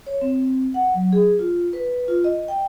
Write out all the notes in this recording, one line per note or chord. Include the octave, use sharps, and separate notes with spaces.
C#5
C4
F#5
F#3
G#4
F4
B4
F4
D#5
G5